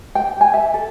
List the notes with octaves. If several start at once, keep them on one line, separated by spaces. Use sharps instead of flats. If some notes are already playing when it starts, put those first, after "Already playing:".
G5
G#5
E5
A4